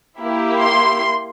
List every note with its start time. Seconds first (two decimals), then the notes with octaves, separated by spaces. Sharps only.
0.20 A#3 E4 G4
0.61 C6